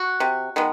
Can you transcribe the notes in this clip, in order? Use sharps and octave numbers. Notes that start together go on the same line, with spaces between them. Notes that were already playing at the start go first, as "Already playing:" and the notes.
Already playing: F#4
C3
D#3 G#3 B3